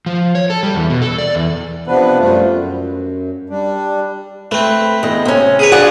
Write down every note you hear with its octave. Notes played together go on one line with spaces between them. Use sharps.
F3
C#5
A4
G3
E2
B2
A4
D5
E2
C3 F3 B3 D4 B4
F#2 F3 G3 A3 F4
F#2
G3 D4
A3 C4 B4
E2 D#5
C3 C#4
G#4 B4 C#5
D4 F4 F#4 G#4 D5 F#5